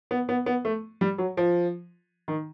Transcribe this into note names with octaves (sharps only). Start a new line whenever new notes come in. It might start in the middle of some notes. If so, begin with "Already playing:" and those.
B3
B3
B3
A3
G3
F#3
F3
D#3